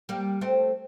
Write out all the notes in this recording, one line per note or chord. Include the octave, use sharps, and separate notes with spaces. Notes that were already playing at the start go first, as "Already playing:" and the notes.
G3 A#3
A3 C4